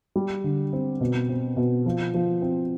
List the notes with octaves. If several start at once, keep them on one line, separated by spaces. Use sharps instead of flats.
G3
D3
C4
B2
C4
B2
F3
F3
C4